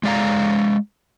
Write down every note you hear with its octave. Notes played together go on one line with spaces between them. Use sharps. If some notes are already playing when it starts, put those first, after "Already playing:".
G#3 D5 F5 A#5